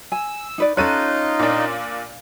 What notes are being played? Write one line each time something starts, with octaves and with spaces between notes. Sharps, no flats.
G#5 E6
D#4 B4 D5
C#4 D#4 F4 A4 C#5 D#5 F#6 D#7
A#2 D4